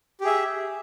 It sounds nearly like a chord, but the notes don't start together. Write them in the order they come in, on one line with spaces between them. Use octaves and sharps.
G4 G#4 E5